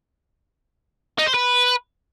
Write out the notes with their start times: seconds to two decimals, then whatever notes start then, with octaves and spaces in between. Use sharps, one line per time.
1.19 D#4
1.26 C5
1.34 B4